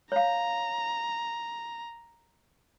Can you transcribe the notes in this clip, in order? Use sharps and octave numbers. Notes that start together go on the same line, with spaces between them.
C#5 F5 A#5